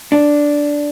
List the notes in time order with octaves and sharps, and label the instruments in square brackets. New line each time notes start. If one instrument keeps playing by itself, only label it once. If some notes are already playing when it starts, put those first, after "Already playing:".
[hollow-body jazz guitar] D4